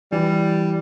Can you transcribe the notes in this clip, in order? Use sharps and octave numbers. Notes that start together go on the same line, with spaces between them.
E3 G3